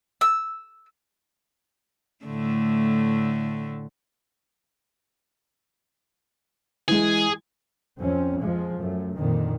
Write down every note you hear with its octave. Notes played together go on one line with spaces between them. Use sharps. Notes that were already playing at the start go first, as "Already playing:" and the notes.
E6
A2 D3 A3
E3 G#3 G#4
F2 C4 C#4
F2 F3 G#3
F#2 A3
F2 A#2 D3 D#3